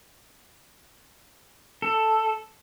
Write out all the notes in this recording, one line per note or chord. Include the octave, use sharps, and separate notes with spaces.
A4